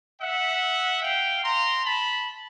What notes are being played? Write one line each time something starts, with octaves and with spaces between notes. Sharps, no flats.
E5 F#5
F5 G5
A#5 C6
A5 B5